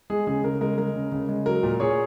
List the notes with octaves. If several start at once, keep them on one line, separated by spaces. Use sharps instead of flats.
G#3 G#4
C#3 G#4
C#3 A#4
G#3 A#4
G#3 A#4
C#3
C#3
G#3
F#3 A#4
A#2
A#2 G#4 C#5